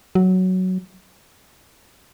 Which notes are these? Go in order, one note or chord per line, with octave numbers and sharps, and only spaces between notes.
F#3